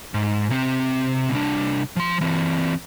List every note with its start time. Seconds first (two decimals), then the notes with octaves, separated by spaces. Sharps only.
0.14 G#2
0.50 C3 C4
1.31 C2 D4
1.96 F3 C6
2.21 E3 C4